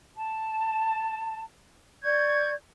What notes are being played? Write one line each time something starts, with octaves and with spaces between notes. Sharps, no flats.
A5
D5 C#6 G6 G#6